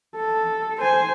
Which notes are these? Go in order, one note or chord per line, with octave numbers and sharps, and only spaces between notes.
A4
C5 G#5